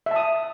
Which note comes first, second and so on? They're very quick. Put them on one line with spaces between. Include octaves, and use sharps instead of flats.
E5 A5 D#6